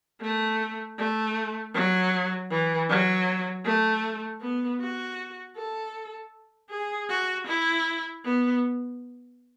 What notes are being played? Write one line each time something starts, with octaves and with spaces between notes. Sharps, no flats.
A3
A3
F#3
E3
F#3
A3
B3
F#4
A4
G#4
F#4
E4
B3